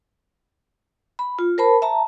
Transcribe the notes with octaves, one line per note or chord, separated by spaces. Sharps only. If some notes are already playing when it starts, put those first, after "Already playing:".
B5
F4
A#4 C5 A5 B5
E5 A5 A#5